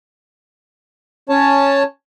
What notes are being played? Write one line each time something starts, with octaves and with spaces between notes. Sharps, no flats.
C#4 C#5 A5